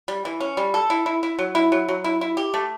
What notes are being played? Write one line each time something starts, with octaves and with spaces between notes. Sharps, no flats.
G3
E3
C#4
G3
A4
E4
E4
E4
F#3
E4
F#3
F#3
E4
E4
G4
A3